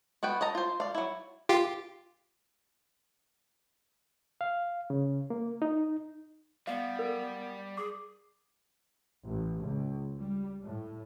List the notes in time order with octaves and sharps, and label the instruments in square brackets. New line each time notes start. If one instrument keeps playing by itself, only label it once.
[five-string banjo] B3 F#4 B4 G5
D#5 A5 A#5
F4 C5
D5 F5
F#3 E4
[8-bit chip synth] F4 G4
[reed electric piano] F5
C#3
A#3
D#4
[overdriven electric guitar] G3 [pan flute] B3 [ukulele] D5 F5
[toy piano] A#4
[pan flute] G#4 [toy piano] D6
[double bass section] A1
C#2
G3
A2